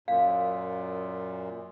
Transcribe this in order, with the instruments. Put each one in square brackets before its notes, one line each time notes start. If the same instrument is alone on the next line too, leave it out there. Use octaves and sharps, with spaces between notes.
[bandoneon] F#2 A#2 [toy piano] F5